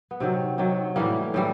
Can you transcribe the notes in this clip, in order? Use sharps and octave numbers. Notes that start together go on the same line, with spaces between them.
B3
C3 D#3 F#3 C4
C3 D#3 F#3
A2 E3 G3 A#3
A2 E3 G3